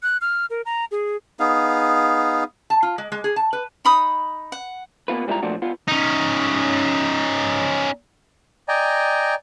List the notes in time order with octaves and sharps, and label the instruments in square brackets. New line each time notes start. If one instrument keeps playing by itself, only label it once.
[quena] F#6
F6
A#4
A#5
G#4
[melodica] B3 D#4 G#4 F5
[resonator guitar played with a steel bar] A5
F4
G#3
G#3
G#4
A5
B4
[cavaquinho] D#4 B5 D#6
F#5
[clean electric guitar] A#3 B3 F4 B4
G#2 G3 A#3 E4 F4 A#5
A#2 F3 A3 D4 F#4
B3 F4
[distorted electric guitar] C#4 D#4
[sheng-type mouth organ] D5 D#5 G5 G#5 A#5